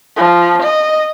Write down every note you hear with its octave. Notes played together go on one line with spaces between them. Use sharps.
F3
D#5